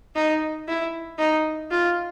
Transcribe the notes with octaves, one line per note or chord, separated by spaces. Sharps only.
D#4
E4
D#4
F4